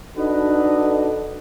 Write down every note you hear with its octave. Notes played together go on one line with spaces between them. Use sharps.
D4 D#4 F#4 A4 B4 D#5